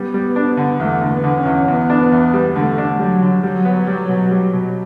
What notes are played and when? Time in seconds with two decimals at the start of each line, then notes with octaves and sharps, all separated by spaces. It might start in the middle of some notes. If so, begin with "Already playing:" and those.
Already playing: G3 B3
0.14 G3
0.36 D4
0.57 D3
0.80 E2 A3
1.02 D3
1.09 B3
1.24 D3
1.38 C#4
1.46 E2
1.67 E2 B3
1.90 D4
2.12 E2
2.34 G3
2.55 D3 A3
2.78 D4
2.99 F#3 G3
3.21 D3
3.43 F#3 G3
3.65 B3
3.87 G3
4.09 B2
4.31 G3
4.53 B2